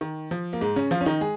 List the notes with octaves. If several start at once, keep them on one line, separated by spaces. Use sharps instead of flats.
D#3
F3
A#3
G#2 G#3
C#3 C#4
F3 F4
C#4
D#3 D#4
G#3 G#4